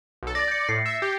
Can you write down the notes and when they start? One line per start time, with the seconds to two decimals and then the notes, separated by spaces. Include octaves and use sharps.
0.23 B1 A4
0.35 D5 A6 A#6
0.48 G6 C#7
0.69 A2 C7
0.86 E5
1.02 G4